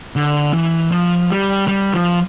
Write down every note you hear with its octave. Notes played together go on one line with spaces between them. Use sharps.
D3
E3
F3
G3
G3
F3